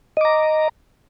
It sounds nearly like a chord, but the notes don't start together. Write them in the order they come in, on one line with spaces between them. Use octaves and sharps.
D#5 D6 A#5